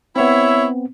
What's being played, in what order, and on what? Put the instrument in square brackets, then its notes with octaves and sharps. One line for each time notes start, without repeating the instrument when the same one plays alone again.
[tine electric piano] B3 C4 [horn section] E4 C#5 E5